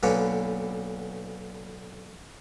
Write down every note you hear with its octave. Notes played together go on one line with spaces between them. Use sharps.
B1 D3 A#3 B3 C#4 B4